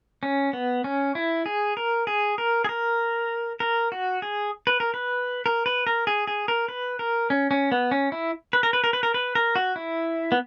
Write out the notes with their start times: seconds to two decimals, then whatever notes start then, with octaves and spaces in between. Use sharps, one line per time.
0.23 C#4
0.53 B3
0.84 C#4
1.15 E4
1.46 G#4
1.77 A#4
2.07 G#4
2.38 A#4
2.64 G#4
2.69 A#4
3.60 A#4
3.92 F#4
4.22 G#4
4.67 B4
4.80 A#4
4.94 B4
5.46 A#4
5.66 B4
5.87 A#4
6.07 G#4
6.27 G#4
6.48 A#4
6.68 B4
6.99 A#4
7.30 C#4
7.51 C#4
7.72 B3
7.91 C#4
8.12 E4
8.53 B4
8.63 A#4
8.73 B4
8.84 A#4
8.93 B4
9.03 A#4
9.14 B4
9.35 A#4
9.55 F#4
9.76 E4
10.32 B3